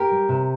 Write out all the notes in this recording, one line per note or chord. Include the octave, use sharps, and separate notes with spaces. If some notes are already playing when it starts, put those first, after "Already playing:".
Already playing: G4 A#4
G3
C3